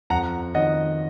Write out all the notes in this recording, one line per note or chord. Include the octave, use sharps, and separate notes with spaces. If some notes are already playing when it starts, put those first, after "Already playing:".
F2 F#5 A#5
D#3 D#5 F#5